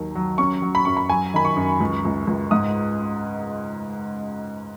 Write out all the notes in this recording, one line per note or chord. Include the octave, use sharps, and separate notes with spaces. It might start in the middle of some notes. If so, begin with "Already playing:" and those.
Already playing: D#2 D#3 F#3
F#3
C#4 C#6
F#3
B5
F#2 C#6
B5
F#3 G#5
D#3 B5
C#6
F#2
C#2
C#2
C#2
G#2 D#6